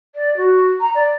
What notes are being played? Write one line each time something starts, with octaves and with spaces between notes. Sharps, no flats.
D5
F#4
A#5
D5